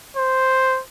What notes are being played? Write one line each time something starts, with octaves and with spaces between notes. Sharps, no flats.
C5